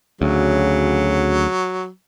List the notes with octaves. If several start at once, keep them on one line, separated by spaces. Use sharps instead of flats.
D2 C#3 F#3